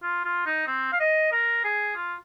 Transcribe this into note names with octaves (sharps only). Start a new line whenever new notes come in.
F4
F4
D#4
C4
F5
D#5
A#4
G#4
F4